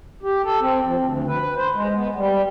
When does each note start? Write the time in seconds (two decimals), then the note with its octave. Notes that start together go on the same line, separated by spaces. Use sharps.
0.23 G4
0.44 A4
0.61 C4
0.85 F3
0.99 D2
1.27 B4
1.56 C5
1.75 G#3
1.95 B3
2.16 G3